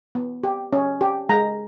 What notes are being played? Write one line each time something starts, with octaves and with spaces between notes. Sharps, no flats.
B3
G4
C#4
G4
G#3 A#5